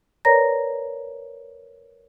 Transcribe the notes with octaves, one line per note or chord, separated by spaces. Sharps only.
A#4 B4 C#5 D5 A#5 A#6